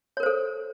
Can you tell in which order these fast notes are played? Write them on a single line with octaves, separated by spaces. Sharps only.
C#5 A#4 C5 A4